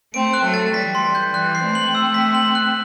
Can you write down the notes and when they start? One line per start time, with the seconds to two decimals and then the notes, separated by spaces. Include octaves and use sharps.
0.13 A3 C4 D7
0.33 F#6
0.44 F#3 A3
0.54 A6
0.74 E3 G3 B6
0.95 C6
1.15 G6
1.34 E3 G3 F#6
1.55 C7
1.64 A3 C4
1.75 F#7
1.95 E6
2.14 B6
2.35 F#7
2.55 F#6